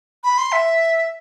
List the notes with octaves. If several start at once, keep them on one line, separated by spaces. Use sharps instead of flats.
B5
C6
E5